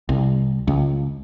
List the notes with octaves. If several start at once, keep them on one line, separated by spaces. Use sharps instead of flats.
C2
C#2